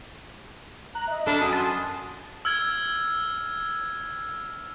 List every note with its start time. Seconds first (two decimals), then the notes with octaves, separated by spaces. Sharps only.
0.95 A#5 F#6
1.07 D#5 E5
1.27 D4 A4 B5
1.40 F#2 G#5 D#6
1.53 A5 C6
2.45 E6 F6 G#6